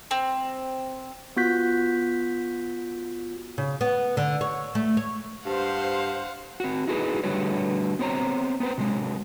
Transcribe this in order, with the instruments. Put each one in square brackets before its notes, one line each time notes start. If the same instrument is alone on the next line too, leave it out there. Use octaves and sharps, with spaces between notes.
[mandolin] C4
[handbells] B3 F4 F#4 F#6 G6 B6
[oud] C#3
B3
D3
C#5
A3
C#5
[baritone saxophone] G2 [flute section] C5 [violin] F5 F#5
[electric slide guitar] C4 F#4
D#4 E4 F#4 G#4 A4 B4
D3 G3 A3 F#4 B4 C#5
B3 C4 C5 C#5 A#5
B3 C4 B4 C5
C3 F#3 G#3